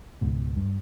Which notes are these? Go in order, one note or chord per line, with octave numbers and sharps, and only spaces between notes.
C#2 G#2 B2
G2